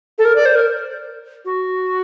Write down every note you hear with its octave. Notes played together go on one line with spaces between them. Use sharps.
A4
A#4
D5
C5
A#4
F#4